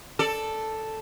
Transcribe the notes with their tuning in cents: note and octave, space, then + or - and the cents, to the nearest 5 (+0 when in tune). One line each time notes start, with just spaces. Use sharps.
A4 +0 D5 +0